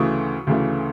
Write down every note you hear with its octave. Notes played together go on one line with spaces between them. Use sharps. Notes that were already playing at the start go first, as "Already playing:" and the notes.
Already playing: D2 C#3 E3 A3 C#6 D#6
D2 C#3 E3 A3